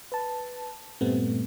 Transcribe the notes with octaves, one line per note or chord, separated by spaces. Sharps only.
B4 A5
G2 A#2 G3 A3 B3 C4